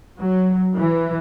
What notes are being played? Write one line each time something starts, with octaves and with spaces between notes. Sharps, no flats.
F#3
E3